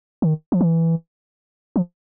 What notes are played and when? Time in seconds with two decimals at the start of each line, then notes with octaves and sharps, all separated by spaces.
0.22 D#3
0.52 F3
0.61 E3
1.76 F3